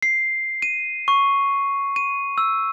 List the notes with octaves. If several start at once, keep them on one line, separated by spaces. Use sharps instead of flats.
C7
D#7
C#6
D#7
E6